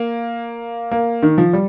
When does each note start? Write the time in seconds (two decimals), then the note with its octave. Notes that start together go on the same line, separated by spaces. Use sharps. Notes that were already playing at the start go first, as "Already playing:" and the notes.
Already playing: A#3
0.91 A#3
1.23 D#3
1.38 F3
1.53 G3